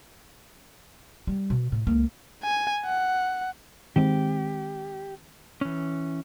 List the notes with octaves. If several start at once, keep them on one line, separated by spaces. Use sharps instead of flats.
G3
B2
A2
C#2 A#3
G#5
F#5
D#3 G#3 C4 G4
E3 C#4